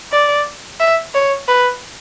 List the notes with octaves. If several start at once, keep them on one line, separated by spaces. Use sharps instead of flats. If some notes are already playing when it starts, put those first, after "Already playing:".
D5
E5
C#5
B4